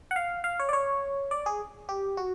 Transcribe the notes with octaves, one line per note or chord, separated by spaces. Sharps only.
F#5
F5
F5
C#5
D5
C#5
D5
G#4
G4
F#4